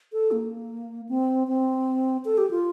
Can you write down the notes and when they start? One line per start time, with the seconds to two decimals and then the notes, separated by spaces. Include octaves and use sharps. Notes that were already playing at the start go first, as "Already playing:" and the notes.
0.13 A4
0.32 A#3
1.09 C4
1.48 C4
2.25 A4
2.38 G4
2.51 F4